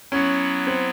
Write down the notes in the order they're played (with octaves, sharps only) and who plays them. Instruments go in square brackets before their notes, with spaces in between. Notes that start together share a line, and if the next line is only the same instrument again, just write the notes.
[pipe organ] F#3 B3 E4 [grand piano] C#4
[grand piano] C4